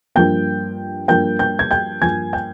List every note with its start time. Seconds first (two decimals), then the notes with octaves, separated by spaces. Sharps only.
0.15 G2 F3 A#3 G5 G6
1.08 G2 F3 A#3 G5 G6
1.39 G5 G6
1.59 G#6
1.71 G5 G6
2.02 G2 F3 A#3 G#5 G#6
2.33 G5 G6